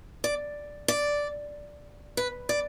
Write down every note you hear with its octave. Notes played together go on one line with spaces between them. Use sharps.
D5
D5
B4
D5